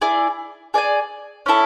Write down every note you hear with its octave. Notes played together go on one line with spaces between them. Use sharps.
E4 G#4 D5
G#4 D5 G#5
C#4 E4 A4